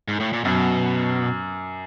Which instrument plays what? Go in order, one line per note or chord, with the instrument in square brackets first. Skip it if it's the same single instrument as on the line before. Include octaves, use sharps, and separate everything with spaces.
[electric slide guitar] G#2
A2
A#2
[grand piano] F#2 [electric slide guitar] B2